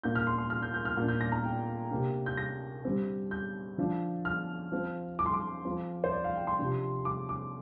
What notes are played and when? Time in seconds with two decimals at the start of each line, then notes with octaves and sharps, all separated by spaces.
0.03 A#2 A#3 D4 G6
0.15 F6
0.27 C6
0.38 C6
0.50 F6
0.62 G6
0.74 G6
0.85 F6
0.97 A#2 A#3 D4 G6
1.08 G6
1.21 A#6
1.32 A#5
1.44 G5
1.91 C3 A#3 D4
2.26 G6
2.37 A#6
2.85 D3 G3 C4
3.31 G6
3.78 D3 F3 D4
4.25 F6
4.72 F3 C4
5.19 D6
5.26 C6
5.34 D6
5.65 F3 C4
6.04 C5
6.12 D5
6.24 F5
6.36 G5
6.47 C6
6.59 C3 F3 D4
7.05 D6
7.29 D6